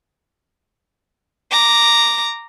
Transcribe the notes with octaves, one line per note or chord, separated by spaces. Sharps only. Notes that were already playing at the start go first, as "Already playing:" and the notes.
A#5 D6